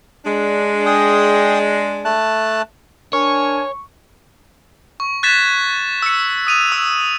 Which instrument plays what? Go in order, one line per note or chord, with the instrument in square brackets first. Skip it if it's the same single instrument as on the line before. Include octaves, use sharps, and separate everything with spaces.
[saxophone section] G#3 D4
[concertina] G#4 G5 D#6
A3 A5 F#6
[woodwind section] D4 A#4 G#5 [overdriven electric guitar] C#5 [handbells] C#6
[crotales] C#6
F#6 G#6 A6 B6 E7
E6 C#7
D#6 D#7 F7
E6